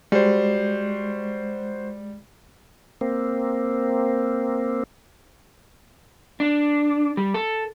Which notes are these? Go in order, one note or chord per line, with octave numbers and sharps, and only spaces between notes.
G3 G#3 F#4 C5
A#3 C4
D4
G3
A4